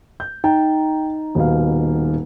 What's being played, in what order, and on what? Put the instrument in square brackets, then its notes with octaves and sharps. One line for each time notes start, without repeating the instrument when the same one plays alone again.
[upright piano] G6
[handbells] D#4 [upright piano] G5
[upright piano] D#1 B2 F5